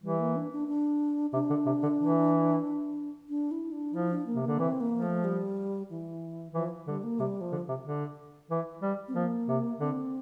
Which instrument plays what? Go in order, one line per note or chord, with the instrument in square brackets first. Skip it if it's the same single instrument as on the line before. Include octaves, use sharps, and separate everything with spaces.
[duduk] E3 [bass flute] G3
[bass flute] A#3
D4
D4
D4
[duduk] C3 [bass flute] D4
[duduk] D3
C3
D3
E3
[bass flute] D4
E4
D4
[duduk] F3 [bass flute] E4
[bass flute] D4
A#3
[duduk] C3
[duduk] D3 [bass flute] A#3
[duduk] E3 [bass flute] C4
[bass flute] A#3
[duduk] F3
[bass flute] A3
G3
E3
[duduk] E3 [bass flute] F3
[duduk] D3 [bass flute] G3
[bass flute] A#3
[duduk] C3 [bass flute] G3
[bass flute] F3
[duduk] D3
C3
D3
E3
G3
[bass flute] C4
[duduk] F3 [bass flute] A#3
[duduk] C3
[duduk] D3 [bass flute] C4